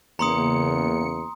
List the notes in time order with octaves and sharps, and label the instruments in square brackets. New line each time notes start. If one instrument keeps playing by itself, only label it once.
[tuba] E2 [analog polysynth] C#3 A#3 C#7 [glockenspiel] A#5 C6 D#6